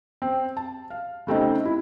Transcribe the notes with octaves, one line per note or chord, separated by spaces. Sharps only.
C4
A5
F5
C#3 A3 C4 D#4
E4